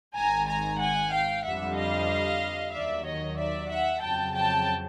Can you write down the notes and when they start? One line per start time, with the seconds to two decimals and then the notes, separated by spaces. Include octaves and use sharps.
0.16 G#1 G#2 D#3 G#5 A#5
0.48 G#5 A#5
0.80 F#5 G#5
1.12 F5 G5
1.45 F2 D3 G3 E5 F#5
1.77 D#5 F5
2.74 D#2 D#3 F#3 D5 E5
3.06 C#5 D#5
3.38 D5 E5
3.70 E5 F#5
4.02 F2 C#3 F#3 G5 A5
4.35 G5 A5